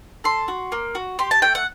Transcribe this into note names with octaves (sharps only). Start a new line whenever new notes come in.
A4 C6
F#4
A#3
F#4
G4 C6
A5
A3 G5
F#5